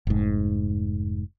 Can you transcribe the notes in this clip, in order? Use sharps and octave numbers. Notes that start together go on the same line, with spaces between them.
F1 G#2